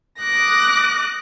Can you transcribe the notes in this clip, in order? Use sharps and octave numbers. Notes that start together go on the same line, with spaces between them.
D6 D#6 F#6 A#6